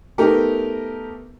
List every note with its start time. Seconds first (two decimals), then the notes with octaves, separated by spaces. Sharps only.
0.18 A3 B3 D#4 G4 A#4